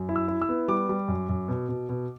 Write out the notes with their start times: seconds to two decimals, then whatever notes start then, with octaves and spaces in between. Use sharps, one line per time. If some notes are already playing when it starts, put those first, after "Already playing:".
Already playing: F#2
0.09 E4
0.16 E6
0.28 E4
0.42 E6
0.49 B3
0.68 G3 D6
0.89 G3
1.08 F#2
1.29 F#2
1.48 B2
1.69 B2
1.89 B2